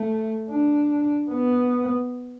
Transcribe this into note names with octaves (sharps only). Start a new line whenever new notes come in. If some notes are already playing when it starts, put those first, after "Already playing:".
Already playing: A3
D4
B3